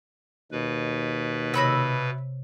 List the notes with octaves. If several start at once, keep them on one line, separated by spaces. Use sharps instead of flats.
D#2 B2 B4
C3 C#5 E5 B5 E6 A#6